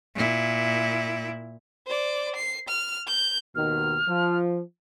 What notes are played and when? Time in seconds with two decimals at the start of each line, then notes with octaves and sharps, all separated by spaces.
0.15 A#2 E4
1.87 C5 D5
2.36 C7
2.68 F6
3.07 G6
3.55 D#2 B2 D#3 F6
4.07 F3